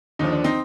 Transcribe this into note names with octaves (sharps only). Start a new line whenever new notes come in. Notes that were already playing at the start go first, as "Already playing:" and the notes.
D#2 D3 F3 D#4
D4
C4 D#4